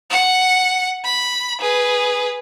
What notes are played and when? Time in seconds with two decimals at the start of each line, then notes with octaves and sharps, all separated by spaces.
0.10 F#5
1.04 B5
1.61 G#4 B4